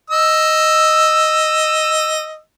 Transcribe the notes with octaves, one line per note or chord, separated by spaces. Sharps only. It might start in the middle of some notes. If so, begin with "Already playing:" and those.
D#5 E6